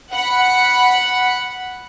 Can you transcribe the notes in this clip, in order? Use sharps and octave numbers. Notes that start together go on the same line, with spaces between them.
F#5 B5